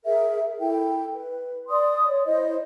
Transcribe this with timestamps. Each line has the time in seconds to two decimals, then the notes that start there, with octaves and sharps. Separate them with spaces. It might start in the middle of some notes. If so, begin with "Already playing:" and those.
0.05 G#4 A#4 E5
0.60 E4 A4 G5
1.14 B4
1.69 D5 C6 D#6
2.08 C#5
2.26 E4 C5 D#5